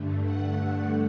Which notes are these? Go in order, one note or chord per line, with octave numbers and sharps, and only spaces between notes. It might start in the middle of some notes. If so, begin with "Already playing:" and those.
Already playing: G2 D3 A3
F#5
F#5